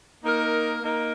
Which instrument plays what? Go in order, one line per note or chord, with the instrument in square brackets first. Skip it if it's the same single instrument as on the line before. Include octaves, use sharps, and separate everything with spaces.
[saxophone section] A#3 D#4 A#4
A#3 D#4 A#4